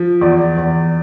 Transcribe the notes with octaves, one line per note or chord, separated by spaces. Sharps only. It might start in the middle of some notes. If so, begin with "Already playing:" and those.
Already playing: F3
E2 D5
E2